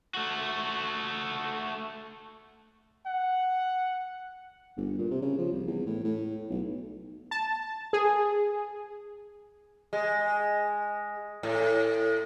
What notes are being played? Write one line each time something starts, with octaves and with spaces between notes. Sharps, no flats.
A3 F#4
F#5
G1
A#2
C3
C#3
F3
C2
E2
A2
A2
B1
A5
G#4
G#3
A2